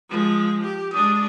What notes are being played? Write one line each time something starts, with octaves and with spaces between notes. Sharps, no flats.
F3 G#3
G4
G#3 D4 D#6